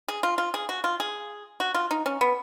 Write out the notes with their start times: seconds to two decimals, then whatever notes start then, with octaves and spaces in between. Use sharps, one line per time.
0.08 G#4
0.23 F4
0.38 F4
0.54 G#4
0.69 F#4
0.84 F4
1.00 G#4
1.60 F#4
1.74 F4
1.91 D#4
2.06 C#4
2.21 B3